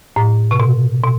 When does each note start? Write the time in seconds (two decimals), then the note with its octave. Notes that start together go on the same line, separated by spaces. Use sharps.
0.16 A2
0.51 C3
0.60 B2
1.04 B2